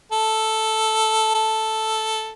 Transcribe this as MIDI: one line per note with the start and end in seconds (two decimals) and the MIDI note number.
0.12 1.30 69
1.35 2.32 69